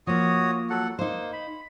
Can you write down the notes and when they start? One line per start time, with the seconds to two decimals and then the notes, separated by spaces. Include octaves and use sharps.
0.07 F3 A#3 F#4 C#5 D#6
0.70 F#3 A4 F#5
0.99 A#3 D#4 C5
1.33 B5